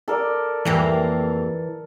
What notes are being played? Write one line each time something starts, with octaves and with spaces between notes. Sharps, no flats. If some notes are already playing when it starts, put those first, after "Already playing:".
A4 A#4 D5
F2 E3 A#3 G4